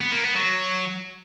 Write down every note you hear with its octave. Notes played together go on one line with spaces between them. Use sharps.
B3
A#3
B3
F#3